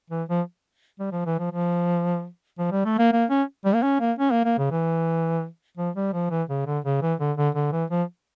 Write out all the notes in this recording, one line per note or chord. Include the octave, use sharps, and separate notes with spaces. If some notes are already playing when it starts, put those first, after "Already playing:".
E3
F3
G3
F3
E3
F3
F3
F3
G3
A3
A#3
A#3
C#4
G3
A#3
C#4
A#3
C#4
A#3
A#3
C#3
E3
F3
G3
F3
E3
C#3
D3
C#3
E3
D3
D3
D3
E3
F3